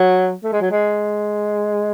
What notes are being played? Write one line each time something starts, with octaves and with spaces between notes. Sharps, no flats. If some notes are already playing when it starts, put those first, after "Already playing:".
Already playing: F#3
A3
G#3
F#3
G#3